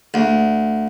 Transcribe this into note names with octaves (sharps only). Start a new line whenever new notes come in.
D2